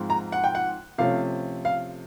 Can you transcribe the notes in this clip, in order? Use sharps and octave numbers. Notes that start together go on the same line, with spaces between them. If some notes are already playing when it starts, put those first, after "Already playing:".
Already playing: G#2 F3 G#3 C4
A#5
F#5
G5
F#5
C3 F3 A3 C#4 F5
F5